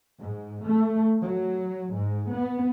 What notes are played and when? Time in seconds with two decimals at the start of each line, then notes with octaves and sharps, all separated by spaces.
0.19 G#2
0.65 A3
1.21 F#3
1.93 G#2
2.33 B3